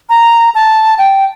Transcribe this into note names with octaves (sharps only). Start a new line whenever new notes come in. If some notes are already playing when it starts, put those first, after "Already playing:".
A#5
A5
G5